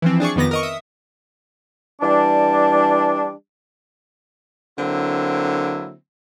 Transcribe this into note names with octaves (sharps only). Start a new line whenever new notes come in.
E3 F3 C4
D4 G#4 D5 C#6
F2 D#3 B3 D6 A#6
A#4 D#5 C#6
E5 D#6
E3 G3 D4
D3 F#3 A#3 C4 E4